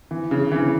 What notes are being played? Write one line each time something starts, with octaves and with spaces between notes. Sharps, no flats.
E3
C#3
E3
C#3